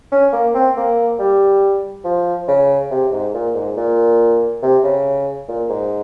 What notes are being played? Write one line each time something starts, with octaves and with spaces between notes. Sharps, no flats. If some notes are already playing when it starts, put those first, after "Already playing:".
C#4
A#3
C4
A#3
G3
F3
C#3
C3
G#2
A#2
G#2
A#2
C3
C#3
A#2
G#2